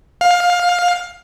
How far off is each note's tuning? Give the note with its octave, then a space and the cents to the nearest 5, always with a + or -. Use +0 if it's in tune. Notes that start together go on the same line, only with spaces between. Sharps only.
F5 +20